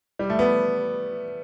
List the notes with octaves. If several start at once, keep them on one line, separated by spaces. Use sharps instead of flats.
G3
A3
B3